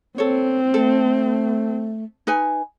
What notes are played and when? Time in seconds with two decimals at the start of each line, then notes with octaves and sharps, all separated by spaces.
0.18 C4 A4 C#5
0.74 A3 A4
2.27 D#4 B4 G#5